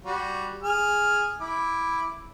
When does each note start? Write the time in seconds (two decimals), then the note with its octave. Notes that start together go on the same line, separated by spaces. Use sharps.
0.04 G3 F#4
0.63 G#4 F6
1.41 E4 D6